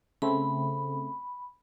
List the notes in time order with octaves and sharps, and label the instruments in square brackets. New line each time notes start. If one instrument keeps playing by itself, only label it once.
[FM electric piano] C#3 A3 C4 [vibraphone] B5